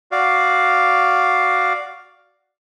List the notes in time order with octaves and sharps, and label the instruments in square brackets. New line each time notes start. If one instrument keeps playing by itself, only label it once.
[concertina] F#4 D5 F5